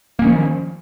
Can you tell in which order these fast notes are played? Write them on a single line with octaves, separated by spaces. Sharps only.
A#3 C#4 D#3 F3